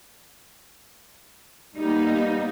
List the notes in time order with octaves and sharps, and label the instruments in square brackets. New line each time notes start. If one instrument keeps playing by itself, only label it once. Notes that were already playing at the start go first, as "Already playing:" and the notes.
[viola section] G3 A#3 [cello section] B3 D#4